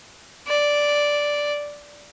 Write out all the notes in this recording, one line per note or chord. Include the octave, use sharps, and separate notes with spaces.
D5